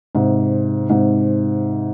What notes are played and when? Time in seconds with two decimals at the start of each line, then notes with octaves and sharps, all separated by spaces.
0.15 G#2 C3
0.89 G#2 C3